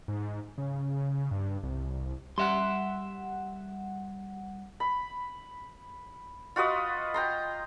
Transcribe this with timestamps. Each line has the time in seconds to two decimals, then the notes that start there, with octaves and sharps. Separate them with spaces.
0.08 G#2
0.58 C#3
1.31 G2
1.63 C2
2.38 G3 E5 F#5 C6
4.80 B5
6.56 F4 F#4 B4 D#5
7.14 G5 A#5 C6